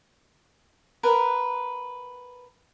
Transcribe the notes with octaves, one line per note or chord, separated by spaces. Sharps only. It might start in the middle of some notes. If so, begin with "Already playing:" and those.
A#4 B4 F#5